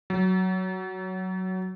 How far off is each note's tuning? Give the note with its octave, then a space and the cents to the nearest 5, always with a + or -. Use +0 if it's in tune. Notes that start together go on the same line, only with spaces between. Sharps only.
F#3 +10